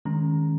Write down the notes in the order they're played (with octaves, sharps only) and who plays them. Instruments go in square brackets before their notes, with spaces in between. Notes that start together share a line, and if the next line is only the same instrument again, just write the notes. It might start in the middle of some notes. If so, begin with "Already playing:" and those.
[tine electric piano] D#3 G#3 C#4 A#5